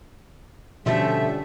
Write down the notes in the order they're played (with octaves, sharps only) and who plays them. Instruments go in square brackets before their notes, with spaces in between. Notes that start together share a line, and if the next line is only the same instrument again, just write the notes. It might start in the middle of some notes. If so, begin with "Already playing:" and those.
[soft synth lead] B2 [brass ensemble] D3 G3 C#4 [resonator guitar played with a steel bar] F3 A3 [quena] E5